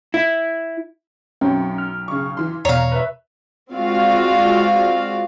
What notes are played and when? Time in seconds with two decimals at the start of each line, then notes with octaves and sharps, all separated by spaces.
0.14 E4
1.41 B1 F#2 C4 C#4 C#5 G5
1.78 F6
2.08 C#3 C#6
2.37 E3 C6
2.65 E2 B2 C#5 F5 A#5
2.92 B4 E5
3.72 G#3 C4 F4 F#4 D5 F5